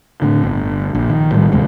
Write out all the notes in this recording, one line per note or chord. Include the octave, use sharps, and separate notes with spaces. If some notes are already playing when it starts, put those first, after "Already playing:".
A2 D3
G1
A#1
D#3
A2 D#3 G3
E1 D2 C3 G#3